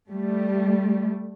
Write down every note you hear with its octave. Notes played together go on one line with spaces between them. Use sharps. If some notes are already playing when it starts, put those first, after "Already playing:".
G3 A3